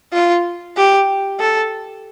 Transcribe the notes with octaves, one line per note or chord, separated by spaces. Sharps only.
F4
G4
A4